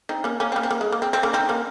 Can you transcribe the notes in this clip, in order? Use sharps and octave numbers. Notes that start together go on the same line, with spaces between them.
C4 D#4
A#3 C#4
A#3 C#4
C4
A#3 C#4
C4
A#3
G#3
A#3
C4
C4
A#3 C#4
C4 D#4
A#3 C#4